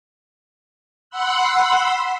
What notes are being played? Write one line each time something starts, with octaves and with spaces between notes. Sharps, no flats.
F#5 B5 C6 E6 F#6